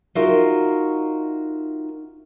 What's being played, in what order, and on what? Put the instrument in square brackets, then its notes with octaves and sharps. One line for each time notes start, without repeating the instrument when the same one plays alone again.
[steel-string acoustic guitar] D#4 F4 F#4 A#4 E5